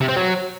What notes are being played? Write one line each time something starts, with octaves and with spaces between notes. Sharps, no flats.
C3
C4
F#3